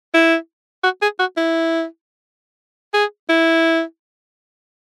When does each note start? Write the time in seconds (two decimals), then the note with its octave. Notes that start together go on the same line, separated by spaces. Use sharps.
0.14 E4
0.84 F#4
1.02 G#4
1.19 F#4
1.37 E4
2.94 G#4
3.29 E4